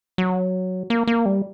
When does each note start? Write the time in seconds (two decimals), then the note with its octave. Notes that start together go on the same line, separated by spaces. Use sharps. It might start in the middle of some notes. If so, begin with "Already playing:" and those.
0.18 F#3
0.90 A#3
1.07 A#3
1.26 G3